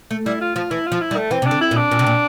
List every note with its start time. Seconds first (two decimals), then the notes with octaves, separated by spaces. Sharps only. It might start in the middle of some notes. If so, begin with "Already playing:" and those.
0.11 A3
0.26 G3 E4
0.41 F4
0.55 F3 F4
0.71 E3 E4
0.86 F4
0.92 F3
1.01 E4
1.11 G3
1.16 A3
1.31 E3 C4
1.42 C3 D4
1.51 D3
1.61 E4
1.71 A#2
1.76 D4
1.91 A#2
1.99 C3
2.06 A#2